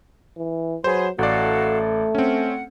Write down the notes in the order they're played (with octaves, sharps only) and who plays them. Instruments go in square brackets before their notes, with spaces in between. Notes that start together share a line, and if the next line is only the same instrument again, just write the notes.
[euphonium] E3
[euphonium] F#3 [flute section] G#4 B4 C6 [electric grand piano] C5
[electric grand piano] A1 D5 [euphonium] A3 [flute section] F#4 A4 F5
[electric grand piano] C4 C#4 [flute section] F#5